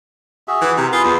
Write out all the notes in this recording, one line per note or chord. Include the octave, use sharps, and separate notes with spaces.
F#4 G#4 E5
E3
C3 A#4
F4 G#4 B4
E2